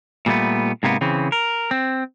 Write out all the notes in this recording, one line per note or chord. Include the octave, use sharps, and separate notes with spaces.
A#2 G3 A3 B3
G#2 C3 A#3 B3
C#3 E3 C4
A#4
C4